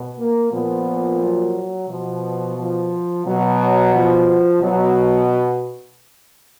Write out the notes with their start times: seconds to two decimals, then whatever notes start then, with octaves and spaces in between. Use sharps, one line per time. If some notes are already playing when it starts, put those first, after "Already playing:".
Already playing: B2
0.20 A#3
0.53 A#2 F3 B3
1.22 F#3
1.90 B2 F3
2.59 F3
3.27 B2 F#3
3.95 F3
4.63 B2 F#3